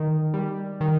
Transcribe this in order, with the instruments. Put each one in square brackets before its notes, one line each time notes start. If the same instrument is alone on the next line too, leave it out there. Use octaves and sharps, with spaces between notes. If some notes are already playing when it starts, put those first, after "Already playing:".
Already playing: [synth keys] D#3
G3
D#3